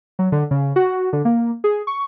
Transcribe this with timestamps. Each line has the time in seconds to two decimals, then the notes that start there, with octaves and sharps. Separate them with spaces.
0.19 F#3
0.32 D3
0.51 C#3
0.76 F#4
1.13 D3
1.25 A#3
1.64 G#4
1.87 C#6